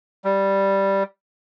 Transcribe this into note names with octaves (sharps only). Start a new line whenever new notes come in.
G3